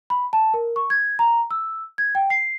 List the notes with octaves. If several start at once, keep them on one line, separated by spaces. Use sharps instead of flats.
B5
A5
A#4
C#6
G#6
A#5
E6
G#6
G5
C7